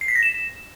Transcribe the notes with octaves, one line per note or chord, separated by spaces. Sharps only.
C7
B6
A#6
E7